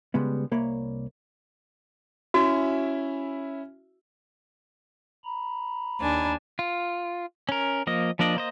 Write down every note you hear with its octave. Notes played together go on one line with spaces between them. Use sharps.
C#3 G3 G#3 B3
C2 A#3 C#5 B5
C#4 E4 F#4 E5
A#5 B5
D#2 D4 G#5
F4
C#4 A#4
F3 A#3 D#5
F3 A#3 D4 D5 D#5
A#3 C5 D#5